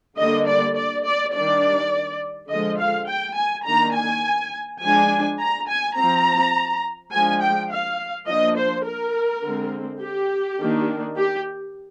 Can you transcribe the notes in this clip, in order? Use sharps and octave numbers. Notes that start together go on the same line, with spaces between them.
D3 G3 A#3 D4 D#5
D5
D5
D5
D#3 G3 D4 D5
D3 F3 G#3 D#5
F5
G5
G#5
D#3 A#3 D4 A#5
G#5
F3 G#3 D4 G#5
A#5
G#5
F3 C4 A#5
F3 G#3 D4 G#5
G5
F5
F3 A#3 D4 D#5
C5
A#4
D3 G#3 C4
G4
D#3 A#3 D4
G4